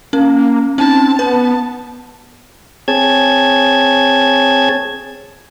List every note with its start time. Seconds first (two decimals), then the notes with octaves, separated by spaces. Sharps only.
0.13 A#3 C#4
0.78 C4 C#4 D#4 A5
1.19 B3 B4 A5
2.88 C4 G#4 C#5 A5 G#6